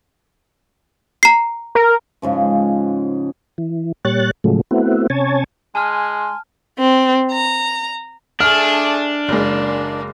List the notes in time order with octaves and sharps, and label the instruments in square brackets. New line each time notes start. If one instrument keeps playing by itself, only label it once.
[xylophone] A#5 C7
[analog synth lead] A#4
[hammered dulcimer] G#2 C#3 F3
[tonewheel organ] E3
A#2 G3 C#5 F#6 A6
A2 C#3 F3 F#3 G#3 A3
A3 B3 C4 E4 F#4
C3 C#4 C#5 G#5 A5
[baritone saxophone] G#3 [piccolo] G#5 [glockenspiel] A5 F6 [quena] C6
[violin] C4
A#5
[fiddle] A3 G#4 [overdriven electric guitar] D4 [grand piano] F6
[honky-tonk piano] F#1 G#3 [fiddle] A#3